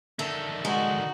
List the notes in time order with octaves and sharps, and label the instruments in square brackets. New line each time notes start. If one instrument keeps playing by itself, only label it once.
[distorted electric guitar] D3 D#3 [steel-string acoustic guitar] A4 [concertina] E5 A#5
[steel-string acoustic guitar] G#3 [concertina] D#4 [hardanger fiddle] F#4